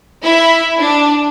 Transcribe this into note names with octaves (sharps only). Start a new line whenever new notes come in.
E4
D4